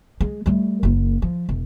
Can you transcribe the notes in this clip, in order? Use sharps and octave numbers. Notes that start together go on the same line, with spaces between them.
G#3
G3 A3
F#1 A#3
F3
E1